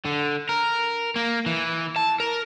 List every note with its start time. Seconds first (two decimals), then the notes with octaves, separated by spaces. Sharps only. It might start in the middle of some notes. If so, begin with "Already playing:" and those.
0.05 D3
0.49 A#4
1.16 A#3
1.46 E3
1.96 A5
2.20 A#4